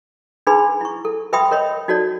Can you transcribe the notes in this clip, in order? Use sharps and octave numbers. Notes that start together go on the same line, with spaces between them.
D4 D#4 G#4 B4 B5 C6
E4 C#6
A4
B4 E5 G5 B5 C6 D#6
A#4 C#5 D#5 B5
D#4 F#4 A4 C#5 D5